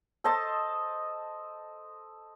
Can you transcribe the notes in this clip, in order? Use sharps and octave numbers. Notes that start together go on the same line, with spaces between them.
A4 C5 D#5 A5